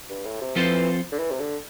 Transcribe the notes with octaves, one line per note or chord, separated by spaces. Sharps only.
G2
A2
C3
E3 F3 C4 F4 A4 C5
D3
E3
C3
D3